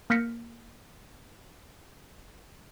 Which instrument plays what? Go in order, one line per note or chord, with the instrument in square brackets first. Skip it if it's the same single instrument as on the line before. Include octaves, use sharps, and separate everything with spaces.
[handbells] A#3 F6 G6 A#6 B6 C#7